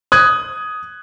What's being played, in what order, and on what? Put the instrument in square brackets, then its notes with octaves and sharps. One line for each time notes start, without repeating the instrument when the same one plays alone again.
[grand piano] D#6 F#6 G#6